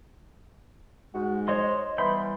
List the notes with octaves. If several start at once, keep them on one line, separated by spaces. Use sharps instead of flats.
G#2 G#3 F#4
C5 C#5 D#5 C6
E3 G3 B3 B5 C6 G6